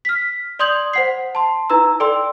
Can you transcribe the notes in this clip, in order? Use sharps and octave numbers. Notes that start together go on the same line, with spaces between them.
F6 B6
D5 C6 D#6 G6 G#6 F#7
C5 F#5 C7
A5 C6
D#4 E4 B4 A#5 E6
A4 D5 G5 C6 E6